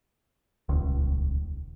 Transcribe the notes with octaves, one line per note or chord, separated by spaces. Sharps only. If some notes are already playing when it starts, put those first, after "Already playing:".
D#1 C#2